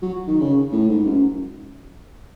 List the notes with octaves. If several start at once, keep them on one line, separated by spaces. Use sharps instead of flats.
F#3
D#3
C#3
A2
G#2
F#2